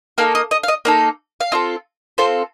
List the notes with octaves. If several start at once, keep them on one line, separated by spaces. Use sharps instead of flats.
A#3 D#4 A4 F5
D#5
D#5
F5
D#5
A#3 D#4 A4 D5
F5
C4 F4 A4 D#5
C4 F4 A4 C5